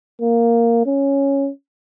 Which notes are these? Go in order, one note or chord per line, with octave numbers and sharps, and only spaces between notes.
A#3
C#4